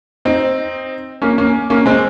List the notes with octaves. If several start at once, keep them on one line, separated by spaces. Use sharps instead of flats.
C4 D#4
A#3 C#4
A#3 C#4
A#3 C#4
G#3 C4